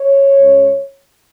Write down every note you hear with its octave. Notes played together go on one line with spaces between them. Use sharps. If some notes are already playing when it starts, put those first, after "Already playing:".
Already playing: C#5
C#2 C#3 G#3